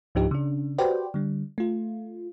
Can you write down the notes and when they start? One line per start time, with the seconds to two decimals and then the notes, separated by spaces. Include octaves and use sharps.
0.15 C#2 G#2 F3 D4 D#4 G4
0.31 C#3 D4
0.78 F#4 G4 B4 C5 D5 G5
1.14 D3 G3
1.58 A3 F4